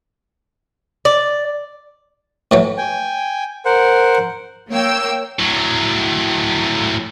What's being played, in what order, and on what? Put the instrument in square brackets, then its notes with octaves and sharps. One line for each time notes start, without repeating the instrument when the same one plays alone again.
[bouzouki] D5
[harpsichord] A2 E3 F#3
[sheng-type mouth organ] G5 G#5
A#4 C5 F#5
[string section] A#3 C#5 G5 E6
[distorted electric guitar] A2 F#3